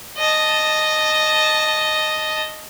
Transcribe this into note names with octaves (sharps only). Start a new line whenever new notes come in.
D#5 A5